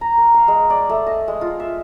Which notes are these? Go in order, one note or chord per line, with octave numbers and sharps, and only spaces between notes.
A#5
A#4
F5
G#3
D5
A3
D#5
G#3
F4
E5